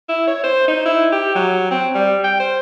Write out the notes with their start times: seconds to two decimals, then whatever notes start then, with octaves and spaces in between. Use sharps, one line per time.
0.09 E4
0.28 C#5
0.44 C5
0.68 D#4
0.86 E4
1.12 G4
1.35 F#3
1.71 C4
1.95 G3
2.24 G5
2.40 C5